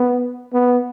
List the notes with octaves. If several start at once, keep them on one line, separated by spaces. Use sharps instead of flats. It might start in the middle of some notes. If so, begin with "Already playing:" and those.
Already playing: B3
B3